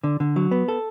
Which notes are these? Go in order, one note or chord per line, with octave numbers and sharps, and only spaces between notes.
D3
D3
F#3
B3
A4